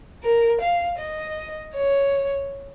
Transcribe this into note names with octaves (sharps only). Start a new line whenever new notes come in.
A#4
F5
D#5
C#5